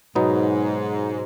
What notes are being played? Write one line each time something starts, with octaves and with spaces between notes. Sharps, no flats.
G#2 B2 F#3 B3 D#4